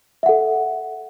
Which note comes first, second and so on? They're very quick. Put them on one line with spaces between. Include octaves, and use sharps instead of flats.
E5 F#5 A4